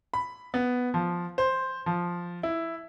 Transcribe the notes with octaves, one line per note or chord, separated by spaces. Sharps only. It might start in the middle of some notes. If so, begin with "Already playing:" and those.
B5
B3
F3
C5
F3
E4